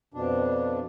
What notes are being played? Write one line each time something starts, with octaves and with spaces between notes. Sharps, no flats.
F2 B2 D4